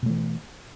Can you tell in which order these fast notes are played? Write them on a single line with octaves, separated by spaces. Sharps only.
B2 A3 E3